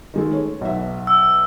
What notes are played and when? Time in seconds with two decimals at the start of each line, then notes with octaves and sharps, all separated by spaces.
0.14 D#3 G#3 A3
0.33 C#5
0.61 B1 E5
1.07 E6